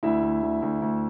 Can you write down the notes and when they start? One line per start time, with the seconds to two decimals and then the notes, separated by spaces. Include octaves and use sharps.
0.03 D2 E4 E5
0.22 D2
0.43 D2
0.62 D2
0.82 D2